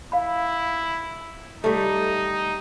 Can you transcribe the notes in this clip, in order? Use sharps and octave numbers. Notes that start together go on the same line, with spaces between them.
E4 F5 B5
G3 A3 D#4